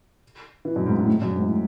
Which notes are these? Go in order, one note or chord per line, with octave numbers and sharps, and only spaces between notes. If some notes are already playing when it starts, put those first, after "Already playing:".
E3
F#2
G#2
A2
G#2
F#2
G#2
A2